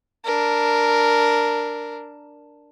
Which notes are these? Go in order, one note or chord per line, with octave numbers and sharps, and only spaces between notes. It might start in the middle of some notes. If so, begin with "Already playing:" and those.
D4 A#4